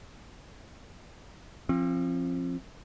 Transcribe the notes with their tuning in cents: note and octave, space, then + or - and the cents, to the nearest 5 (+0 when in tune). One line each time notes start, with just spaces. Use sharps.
F3 -15 C4 +35